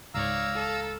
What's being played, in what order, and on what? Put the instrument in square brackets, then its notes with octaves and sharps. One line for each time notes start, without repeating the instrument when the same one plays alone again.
[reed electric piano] C#2 G#2 [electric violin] C#5 D5 [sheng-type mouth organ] F5 A#5 E6
[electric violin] A4